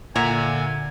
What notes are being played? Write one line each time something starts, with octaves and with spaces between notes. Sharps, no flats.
A#2 D3 E5 F#5 G#5 A#5